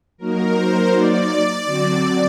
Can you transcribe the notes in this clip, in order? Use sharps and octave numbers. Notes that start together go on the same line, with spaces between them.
F#3 A#3 D#4 F#4 A#4
C5
D5
D3 F#3 C4 F#4